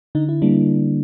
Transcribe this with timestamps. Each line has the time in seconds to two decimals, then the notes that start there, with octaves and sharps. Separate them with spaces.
0.15 D3 D#4
0.29 E4
0.42 G3 A#3 D4